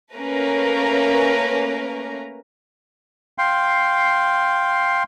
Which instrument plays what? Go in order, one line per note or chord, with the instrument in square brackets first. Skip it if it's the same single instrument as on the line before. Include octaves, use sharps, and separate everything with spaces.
[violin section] A3 A#3 C#4 A#4 B4 A#5
[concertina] F5 G5 C6